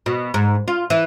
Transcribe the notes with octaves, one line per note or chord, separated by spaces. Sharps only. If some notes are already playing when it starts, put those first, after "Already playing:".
B2
G#2
F4
E3